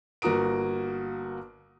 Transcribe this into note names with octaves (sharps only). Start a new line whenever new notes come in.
G1 A#3 F#4 A#5 D#6 D7